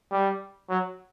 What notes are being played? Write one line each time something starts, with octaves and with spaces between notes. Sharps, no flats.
G3
F#3